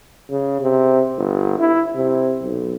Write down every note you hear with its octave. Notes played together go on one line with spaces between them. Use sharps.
C#3
C3
G1
E4
C3
B1